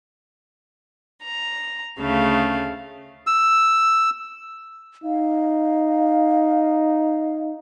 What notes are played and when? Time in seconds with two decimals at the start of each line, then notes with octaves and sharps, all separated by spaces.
1.23 A#5
1.98 D2 C#3 A3 F5
3.27 E6
5.04 D#4 F5